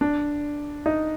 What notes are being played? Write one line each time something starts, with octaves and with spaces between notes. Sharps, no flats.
D4
D#4